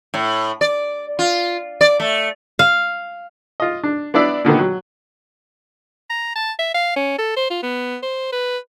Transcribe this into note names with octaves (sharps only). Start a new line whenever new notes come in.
A2
D5
F4
D5
A3
F5
F4 D#5
D4
B3 D4 E4 D5 E5
A#2 D3 D#3 B3
F#3
A#5
A5
E5
F5
C#4
A4
C5
F4
B3
C5
B4